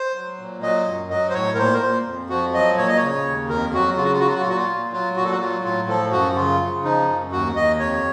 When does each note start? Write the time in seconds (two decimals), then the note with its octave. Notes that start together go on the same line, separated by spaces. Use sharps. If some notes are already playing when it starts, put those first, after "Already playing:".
Already playing: C5
0.15 F#3
0.39 A#2
0.62 F#3 D#5
0.86 F#2
1.10 F#3 D#5
1.29 C5
1.34 A2 C#5
1.53 A#4
1.58 A#2 C5
1.73 A#4
1.82 A#2 C5
2.06 F2
2.29 F3 F#4
2.53 F#3 D#5
2.77 A#2 C#5
2.88 D#5
2.97 C#3 C#5
3.25 D#2
3.49 F2 A#4
3.73 F#3 F#4
3.96 C#3 F4
4.04 F#4
4.12 F4
4.19 F#3 F#4
4.27 F4
4.34 F#4
4.41 F4
4.45 A#2 F#4
4.56 F4
4.69 A#2
4.92 F#3 F4
5.16 A#2 F#4
5.25 A4
5.31 F#4
5.40 F#3 F4
5.64 A2 F4
5.88 F3 A4
6.11 F#2 F#4
6.36 C#3 F4
6.60 C#3
6.84 F3 D#4
7.07 F#2
7.32 D#2 F#4
7.56 D#2 D#5
7.79 F2 C#5